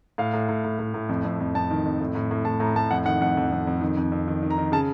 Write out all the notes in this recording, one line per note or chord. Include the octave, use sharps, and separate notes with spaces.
A2 F5
A2
A2
A2
A2
A2
F2
F2
F2
F2 A5
D#3
F2
A2
A2
A2
A2 A5
A2 A#5
A2 A5
F2 F#5
D#3 F#5
F2 F#5
F2
F2
F2
D#3
F2
F2
D#3
D#3
A#5
D#3
C#3 A5